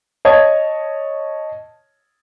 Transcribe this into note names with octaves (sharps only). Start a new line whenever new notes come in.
C#5 D#5 A5 G#6